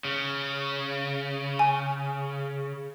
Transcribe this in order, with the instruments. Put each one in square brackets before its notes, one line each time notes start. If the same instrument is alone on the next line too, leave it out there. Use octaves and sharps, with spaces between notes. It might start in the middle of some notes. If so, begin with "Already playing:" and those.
[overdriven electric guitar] C#3
[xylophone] G#5